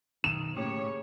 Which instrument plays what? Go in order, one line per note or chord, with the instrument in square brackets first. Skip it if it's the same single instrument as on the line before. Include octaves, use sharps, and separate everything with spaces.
[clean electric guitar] B1 F2 D#3 [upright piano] E7
[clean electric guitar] A2 G4 [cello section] C#3 A#3 C#5